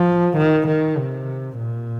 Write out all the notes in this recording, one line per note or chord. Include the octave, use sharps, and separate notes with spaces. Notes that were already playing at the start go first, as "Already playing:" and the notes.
Already playing: F3
D#3
D#3
C3
A#2